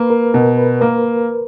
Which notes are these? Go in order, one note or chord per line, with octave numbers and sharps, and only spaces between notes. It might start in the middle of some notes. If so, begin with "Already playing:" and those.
Already playing: A#3 B4
A#4
B2 A#4
B4
A#3 A#4